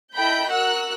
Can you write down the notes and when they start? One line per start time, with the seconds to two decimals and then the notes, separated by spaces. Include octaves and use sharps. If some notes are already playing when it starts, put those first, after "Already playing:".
0.14 E4 A4 D#5 G5 B5 G6
0.49 F#4 A#4 F#5 E6 F#6